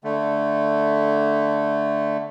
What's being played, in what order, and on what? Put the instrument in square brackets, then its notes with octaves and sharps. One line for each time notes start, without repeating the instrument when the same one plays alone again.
[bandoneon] D3 A3